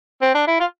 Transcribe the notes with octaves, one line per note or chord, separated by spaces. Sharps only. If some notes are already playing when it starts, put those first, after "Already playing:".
C4
D4
E4
F4